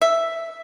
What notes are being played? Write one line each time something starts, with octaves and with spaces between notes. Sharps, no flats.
E5